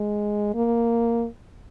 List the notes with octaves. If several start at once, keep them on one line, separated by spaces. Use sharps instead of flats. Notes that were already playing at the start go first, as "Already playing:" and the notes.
Already playing: G#3
A#3